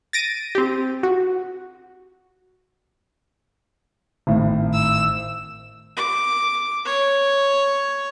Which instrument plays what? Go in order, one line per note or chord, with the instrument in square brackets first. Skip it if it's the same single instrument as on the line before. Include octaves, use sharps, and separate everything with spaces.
[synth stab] A6 A#6 D7 D#7
C4 G4
F#4
[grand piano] G#1 A2
[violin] E6
[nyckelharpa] D6
C#5